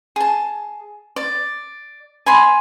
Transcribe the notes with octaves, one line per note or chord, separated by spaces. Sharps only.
G#4 A5
D5
G#5 B5 C6